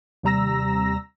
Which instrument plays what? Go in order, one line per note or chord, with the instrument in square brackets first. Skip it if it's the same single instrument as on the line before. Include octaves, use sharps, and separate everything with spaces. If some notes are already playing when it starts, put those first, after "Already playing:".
[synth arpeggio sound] D#2 C3 G3 A#5 E6 A#6